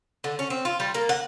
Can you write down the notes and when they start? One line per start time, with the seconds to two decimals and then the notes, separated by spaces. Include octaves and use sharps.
0.24 D3
0.39 C#4
0.50 C4
0.65 F4
0.80 G3
0.94 A#3
1.09 F#5